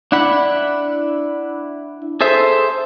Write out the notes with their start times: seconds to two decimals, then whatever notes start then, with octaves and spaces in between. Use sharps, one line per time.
0.12 D4 E4 F#5 B5
2.21 G#4 A4 C5 E5